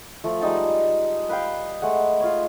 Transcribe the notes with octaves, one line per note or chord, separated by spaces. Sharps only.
F3 A3
G3 G#3 D#4 A5
B4 F5 G5
G#3 A3 F#5
F4 C#5